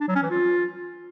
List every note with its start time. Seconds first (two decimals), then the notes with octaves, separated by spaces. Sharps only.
0.01 D4
0.08 F#3
0.15 C#4
0.23 E3
0.30 F4